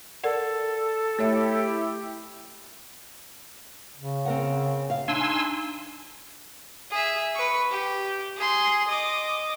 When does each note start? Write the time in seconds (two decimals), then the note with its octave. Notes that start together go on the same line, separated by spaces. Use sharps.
0.24 A4 A#4 D5 F#5
1.19 A3 E4 G4 C#5 E5
3.97 C#3
4.25 C4 A#4 F#5
4.90 F5
5.08 D4 D#4 G#5 C6 E6
6.90 G#4 E5
7.35 B4 C#6
7.70 G4
8.36 G#4 C6
8.88 D#5 D6